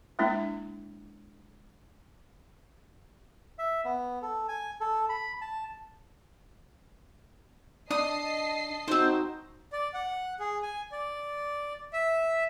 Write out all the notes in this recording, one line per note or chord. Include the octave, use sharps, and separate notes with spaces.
G#3 A#3 D4 E4
E5
B3
A4
G#5
A4
B5
A5
D4 D#5 A5 D#6 C7
C4 D#4 F#4 C5
D5
F#5
G#4
G#5
D5
E5